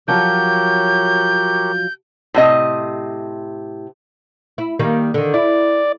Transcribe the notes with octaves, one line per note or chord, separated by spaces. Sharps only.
F3 F#3 G4 A#4 C#5 G6
A2 C3 D#5
E4
D#3 G3 A#3
D3 D#3
E4 D5